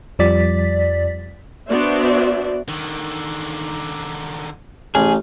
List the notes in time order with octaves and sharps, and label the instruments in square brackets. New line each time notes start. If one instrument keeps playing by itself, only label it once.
[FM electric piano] F2 F3 G3 D5 A6 B6
[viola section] B3 D4 F#4 C5 D5 E5
[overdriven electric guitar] D3 D#3
[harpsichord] A1 [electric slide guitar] G#4